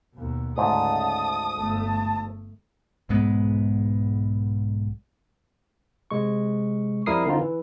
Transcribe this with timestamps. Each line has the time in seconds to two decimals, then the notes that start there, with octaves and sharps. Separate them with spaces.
0.14 D#2 B2
0.58 D2 G#2 C#3 A3 A5 D#6
1.57 G1 A3 A5
3.09 B1 G#2 G#3 B3
6.11 C3 G#3 C#6
7.06 F2 G3 E4 A#4 D#6 C7
7.26 D3 C4 D#4 F4
7.38 E3